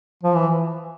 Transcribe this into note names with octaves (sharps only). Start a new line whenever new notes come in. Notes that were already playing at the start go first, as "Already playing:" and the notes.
F3
E3